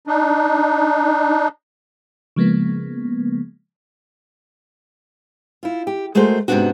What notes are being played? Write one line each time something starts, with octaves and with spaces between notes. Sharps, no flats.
D4 D#4
C#3 F3 G#3 A#3 B3
E4 F4
G4
G#3 A3 F#4 G#4 A#4 C5
G#2 C3 A3 B3 D4 F#4